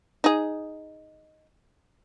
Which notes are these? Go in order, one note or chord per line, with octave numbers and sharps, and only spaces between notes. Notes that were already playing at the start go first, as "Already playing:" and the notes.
D#4 G#4